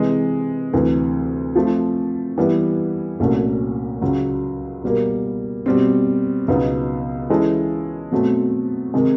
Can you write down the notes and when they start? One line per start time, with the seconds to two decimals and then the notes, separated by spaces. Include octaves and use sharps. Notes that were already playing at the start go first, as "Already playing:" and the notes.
Already playing: C3 E3 G#3
0.73 D2 C3 E3
1.56 F3 A3 C4
2.38 E3 G3 B3 E4
3.20 C2 A#2 F#3 A3 C#4
4.02 C#2 C#3 F#3
4.84 B2 G3 A#3
5.66 B2 G3 C4
6.48 C#2 B2 F#3 B3 D#4
7.30 E3 G#3 C#4 E4 A4
8.12 B2 F#3 A3 C4
8.94 C3 D#3 G#3